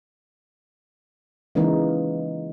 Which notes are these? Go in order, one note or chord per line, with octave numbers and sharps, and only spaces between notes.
C#3 E3 G#3 A#3 D#4